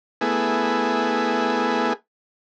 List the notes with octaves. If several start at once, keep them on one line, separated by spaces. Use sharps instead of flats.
A3 B3 E4 G#4